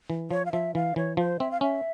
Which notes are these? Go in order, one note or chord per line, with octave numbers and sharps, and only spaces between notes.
E3
F3 C#5
F5
F3 E5
E3 F5
E3 C#5
F3 C5
C4 E5
F5
C#4 E5